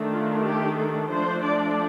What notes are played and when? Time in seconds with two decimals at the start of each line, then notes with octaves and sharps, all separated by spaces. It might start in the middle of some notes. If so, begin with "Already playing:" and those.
Already playing: D#3 A3 D4
0.10 F4
0.43 G4
0.77 A4
1.10 F3 A3 D4 C5
1.44 D5